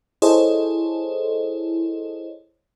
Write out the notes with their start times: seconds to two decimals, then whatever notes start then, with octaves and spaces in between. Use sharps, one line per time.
0.22 E4 G#4 A4 C5 C#5 D#5